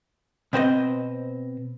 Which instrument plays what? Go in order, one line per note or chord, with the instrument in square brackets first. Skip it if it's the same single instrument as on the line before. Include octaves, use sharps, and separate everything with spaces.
[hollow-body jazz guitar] B2 C4 C5 D#5